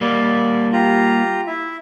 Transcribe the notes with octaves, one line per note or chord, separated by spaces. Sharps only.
G3 A#3 D5
F4 G4 A#5
E4 E5